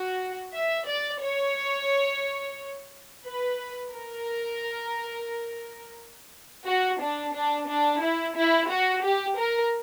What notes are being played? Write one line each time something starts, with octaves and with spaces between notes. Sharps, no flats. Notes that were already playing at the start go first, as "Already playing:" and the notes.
Already playing: F#4
E5
D5
C#5
B4
A#4
F#4
D4
D4
D4
E4
E4
F#4
G4
A#4